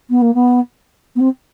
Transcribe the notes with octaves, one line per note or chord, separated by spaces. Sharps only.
B3
A#3
B3
B3
C4